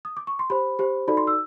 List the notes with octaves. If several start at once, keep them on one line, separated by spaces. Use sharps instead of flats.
D#6
D6
C#6
C6
G4 C5 B5
G4 C5
D#4 F#4 A4 D5 B5
C6
E6